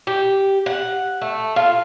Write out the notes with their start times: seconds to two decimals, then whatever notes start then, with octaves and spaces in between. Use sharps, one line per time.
0.07 G4
0.66 F#5
1.21 A3
1.56 F4